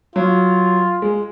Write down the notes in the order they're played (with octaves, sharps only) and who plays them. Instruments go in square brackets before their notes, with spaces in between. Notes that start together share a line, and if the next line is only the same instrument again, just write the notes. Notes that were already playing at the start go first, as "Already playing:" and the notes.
[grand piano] F#3 [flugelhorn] F4
[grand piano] G#3